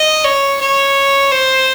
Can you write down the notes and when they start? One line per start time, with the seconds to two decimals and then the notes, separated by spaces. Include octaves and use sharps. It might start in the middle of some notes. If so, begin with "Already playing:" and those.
Already playing: D#5
0.24 C#5
0.61 C#5
1.31 C5